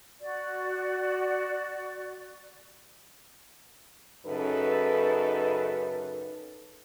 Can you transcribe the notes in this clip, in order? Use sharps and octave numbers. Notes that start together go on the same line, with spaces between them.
F#4 D5
F#2 C#3 D#4 A4 B4